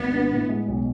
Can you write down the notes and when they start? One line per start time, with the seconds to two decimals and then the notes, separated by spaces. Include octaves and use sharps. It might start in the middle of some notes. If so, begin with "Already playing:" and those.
Already playing: G#1 B3
0.13 D4
0.31 A2
0.49 G#3
0.67 B1